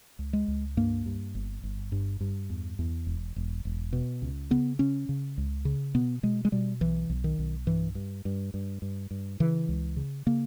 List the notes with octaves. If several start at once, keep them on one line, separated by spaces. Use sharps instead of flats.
C#2
G#3
C#2
G2 A#3
G2
G1
G1
G2
G2
E2
E2
E1
E1
E1
B2
C#2
C#3 B3
C#3 C#4
C#3
C#2
C#3
B2 B3
B2 G#3
G#3
B2 G3
B1 E3
B1
D#3
B1
G2 E3
G2
G2
G2
G2
G2
C#3 E3
C#2
C#3
C#3 A#3